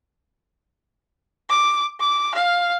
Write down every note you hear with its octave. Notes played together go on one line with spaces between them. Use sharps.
D6
D6
F5